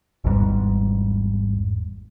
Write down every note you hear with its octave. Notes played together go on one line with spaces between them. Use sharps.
G#1 E2 G#2 G3